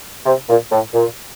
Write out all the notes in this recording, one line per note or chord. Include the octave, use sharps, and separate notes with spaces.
C3
A#2
A2
A#2